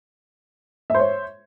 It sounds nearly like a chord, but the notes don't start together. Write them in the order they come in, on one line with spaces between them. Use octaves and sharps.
E5 C5 C#5